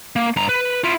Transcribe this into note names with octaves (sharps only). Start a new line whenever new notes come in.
A#3
G2 A#5
B4
E4 F4